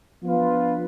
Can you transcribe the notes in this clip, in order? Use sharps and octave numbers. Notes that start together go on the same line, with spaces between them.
F3 B3 D4 F4 B4